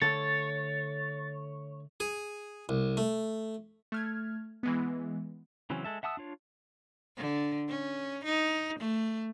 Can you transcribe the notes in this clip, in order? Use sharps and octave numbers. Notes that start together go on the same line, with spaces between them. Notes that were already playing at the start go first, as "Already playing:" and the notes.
D3 A3 A4 C#5 A6
G#4
C2
A3
A3 F6 G#6
E3 G#3 B3
C#3 E3 F#3 C4 C#4
G#3 A4 E5
E5 F#5 A5 D#6 E6
D4 F4 C#5
D3
C#4
D#4
A3